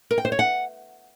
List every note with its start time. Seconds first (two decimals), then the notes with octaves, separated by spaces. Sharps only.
0.11 A#4
0.18 G5
0.25 C5
0.32 C#5
0.39 F#5